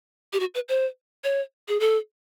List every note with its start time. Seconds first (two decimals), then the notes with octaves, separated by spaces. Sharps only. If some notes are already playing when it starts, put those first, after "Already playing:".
0.33 G4
0.40 F#4
0.55 B4
0.69 C5
1.24 C#5
1.68 G#4
1.80 A4